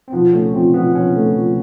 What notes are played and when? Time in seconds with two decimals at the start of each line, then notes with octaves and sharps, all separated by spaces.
0.08 C4
0.12 B2 F3 B3
0.33 C#3 A3 C#4
0.53 C3 F3 C4
0.74 B2 F3 B3
0.95 C#3 F3 C#4
1.16 A3
1.35 F3